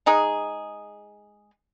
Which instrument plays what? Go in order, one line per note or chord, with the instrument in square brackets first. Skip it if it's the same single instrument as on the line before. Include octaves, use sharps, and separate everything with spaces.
[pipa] G#3 D#4 G#4